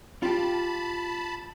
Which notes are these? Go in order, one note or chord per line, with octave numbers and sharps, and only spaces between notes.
F4 G4 A5 B5